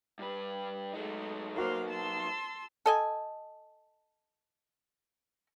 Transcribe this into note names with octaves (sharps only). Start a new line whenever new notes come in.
G2 B4
F#3 G#3 A3 D#4 G#4
A#3 F#4 C5 F5 C6 D6
A5 C6 E6
A4 D#5 G#5